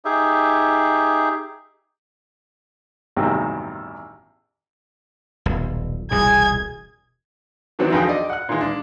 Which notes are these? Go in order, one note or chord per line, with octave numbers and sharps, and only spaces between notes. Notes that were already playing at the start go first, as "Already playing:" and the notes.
D#4 G4 G#4 E5
A1 E2 G2 C3 D#3 F#3
D#1 B1
E1 C2 A#2 G#4 G#6
D#3 E3 F#3 B3 C4 D4
B1 F2 D3 G#4 B4 G5
D5 D#5
F#5 F#6
A#2 D#3 E3 G#3
D4